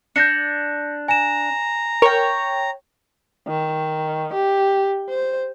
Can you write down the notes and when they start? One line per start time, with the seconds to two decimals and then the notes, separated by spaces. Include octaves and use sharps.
0.16 D4 G6 A#6 C#7
1.08 G#5 A#5 E7
2.02 A#4 C#5 G5
3.48 D#3
4.33 G4
5.09 C5